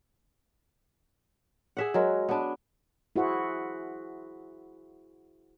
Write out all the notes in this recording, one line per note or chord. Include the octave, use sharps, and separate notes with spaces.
G#4 E5 F#5
F#3 G#3 A#4
B3 D4
E4 F#4 G#4 C5 E5 F#5